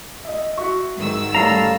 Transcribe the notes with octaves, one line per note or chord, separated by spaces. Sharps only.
D#5 E5
F#4 E5 C#6
G#2 D#3 E6
G3 A3 C#4 A4 F5 A#5